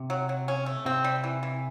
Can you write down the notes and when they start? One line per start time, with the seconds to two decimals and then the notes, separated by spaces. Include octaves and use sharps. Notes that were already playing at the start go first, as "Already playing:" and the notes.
Already playing: C3
0.10 F#3
0.29 F#3
0.48 C#4
0.66 A3
0.85 C3 C4
1.04 G3
1.24 E3
1.43 E3